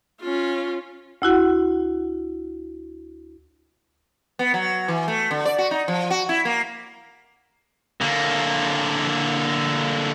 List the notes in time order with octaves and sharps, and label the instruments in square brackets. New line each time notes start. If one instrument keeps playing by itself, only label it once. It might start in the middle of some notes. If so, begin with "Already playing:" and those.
[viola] C#4 F4
[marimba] D2 E4 F#4 F#5
[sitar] B3
F#3
E3
A3
D3
D5
F#4
D#4
F3
F#4
E4
A#3
[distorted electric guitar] D3 A#3